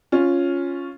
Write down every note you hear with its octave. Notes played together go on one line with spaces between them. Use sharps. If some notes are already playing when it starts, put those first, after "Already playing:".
C#4 F4